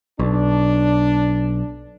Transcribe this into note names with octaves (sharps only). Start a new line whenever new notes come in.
B1 D4